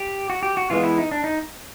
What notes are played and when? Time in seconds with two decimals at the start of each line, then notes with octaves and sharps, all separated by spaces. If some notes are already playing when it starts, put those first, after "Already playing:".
Already playing: G4
0.30 F#4
0.43 G4
0.57 F#4
0.70 E3 G#3 B3 F4
0.83 E4
0.98 D#4
1.12 D4
1.24 D#4